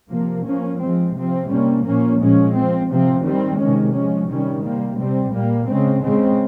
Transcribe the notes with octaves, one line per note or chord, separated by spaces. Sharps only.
C3 F3 A#3
F3 A#3 C#4
F3 G#3 C4
C3 F3 C4
C3 G3 A#3 C#4
A#2 F3 A#3 C#4
A#2 F3 G#3 C#4
F3 C4
C3 F3 C4
D#3 G3 C4
C3 D#3 G#3 C#4
F3 G#3 C#4
C3 D#3 G3 C#4
C3 G3 A#3
C3 G3 C4
A#2 G3 A#3
C#3 G#3 C4
C#3 G#3 C4